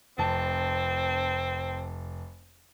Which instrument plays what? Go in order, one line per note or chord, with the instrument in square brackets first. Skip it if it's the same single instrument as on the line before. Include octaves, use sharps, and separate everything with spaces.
[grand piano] F1 A5 [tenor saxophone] C4